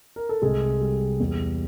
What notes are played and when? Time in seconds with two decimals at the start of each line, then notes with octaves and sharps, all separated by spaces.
0.16 A#4
0.29 A4
0.42 C2 G#3 G#4
0.80 G3
1.20 E2